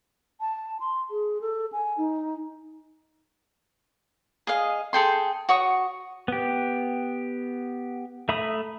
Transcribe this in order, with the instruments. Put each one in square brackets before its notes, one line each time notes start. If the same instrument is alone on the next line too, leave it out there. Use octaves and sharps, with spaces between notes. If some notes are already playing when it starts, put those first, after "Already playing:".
[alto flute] A5
C6
G#4
A4
G#5
D#4
[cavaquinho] G#4 D#5 F5
G#4 A4 G5 C6
F#4 C#5 C#6 D#6
[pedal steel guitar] B3 G4
A3 E5 A#5 B5 D#6